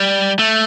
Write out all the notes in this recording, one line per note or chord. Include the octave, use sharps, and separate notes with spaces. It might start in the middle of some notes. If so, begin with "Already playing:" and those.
Already playing: G3
A3